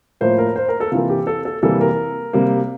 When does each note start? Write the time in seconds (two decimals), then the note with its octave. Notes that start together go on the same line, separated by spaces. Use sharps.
0.21 A2 F3 A#3 C5
0.38 A#4
0.56 C5
0.69 A#4
0.80 A4
0.91 C3 E3 A#3 F4
1.10 G4
1.27 A4
1.45 A4
1.63 C3 E3 G3 A#3 A4
1.81 A#4
2.33 C3 G3 A#3